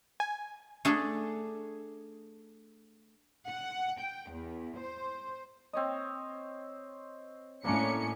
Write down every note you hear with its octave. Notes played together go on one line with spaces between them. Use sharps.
G#5
A3 D4 G#4
F#5
G5
E2
C5
C4 C#5 D#5
A2 A#3 C#4 D4 D6 C#7